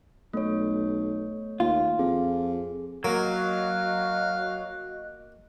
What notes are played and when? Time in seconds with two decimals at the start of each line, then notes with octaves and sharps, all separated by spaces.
0.33 B1 A3 C#5
1.60 D#2 F4
1.99 F2 G#4
3.04 F#3 A#3 F#4 D#5 F5 F#6